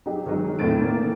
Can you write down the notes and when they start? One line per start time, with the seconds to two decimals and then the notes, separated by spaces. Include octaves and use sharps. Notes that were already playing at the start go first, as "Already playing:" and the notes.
0.06 F#3 D#4 G4 G#4
0.26 D#3 F#3 G#3
0.59 E2 A2 C4 A6 D7
0.78 A2 E3 A#3